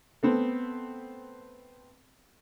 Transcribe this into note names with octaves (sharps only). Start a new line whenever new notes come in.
A3 B3 C4